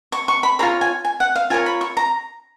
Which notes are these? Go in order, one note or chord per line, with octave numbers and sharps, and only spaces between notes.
C#6
C#6
B5
F4 G#4 C#5 A#5
G#5
G#5
F#5
F5
F4 A#4 C#5 G#5
B5
C#6
A#5